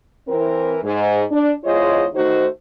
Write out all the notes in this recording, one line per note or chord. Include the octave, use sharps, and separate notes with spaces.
E3 C4 A#4
G#2
D4
E2 G#3 F4 C5 C#5 D#5
D#3 A3 D#4 F#4 C5